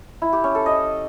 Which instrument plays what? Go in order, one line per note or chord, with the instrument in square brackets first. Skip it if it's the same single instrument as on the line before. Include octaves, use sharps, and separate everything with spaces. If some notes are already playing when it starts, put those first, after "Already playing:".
[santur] E4
G4
C#4
A4
D#5